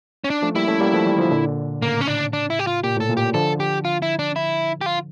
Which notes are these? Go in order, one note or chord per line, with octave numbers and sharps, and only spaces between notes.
C#4
D4
F3 A3
G3 A#3 E4
A3 C#4
G3 A#3
F3 A3
E3 G3
D3 F3
A#2 D3
A2 C#3 A#3
C#4
D4
D4
E4
G4
F4
A#2 G4
A2 A4
A#2
G4
D3 F3 A4
G4
F4
E4
D4
E4
G4
F4